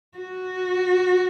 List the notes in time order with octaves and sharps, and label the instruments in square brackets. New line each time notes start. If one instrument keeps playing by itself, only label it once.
[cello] F#4